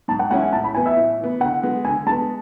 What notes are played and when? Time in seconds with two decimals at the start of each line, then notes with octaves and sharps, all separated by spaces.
0.08 G#2 A5
0.19 F#5
0.31 E3 G#3 C#4 E4 F#5
0.42 G#5
0.53 A2 A5
0.64 B5
0.74 E3 B3 G#5
0.86 E5
0.96 A2
1.18 E3
1.24 B3
1.40 D3 F#5
1.63 G#3 B3
1.85 D3 G#5
2.07 G#3 A5
2.11 B3